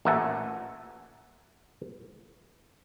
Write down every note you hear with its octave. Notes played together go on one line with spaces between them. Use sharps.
A1 A#2 E5 F#5 G#5 A5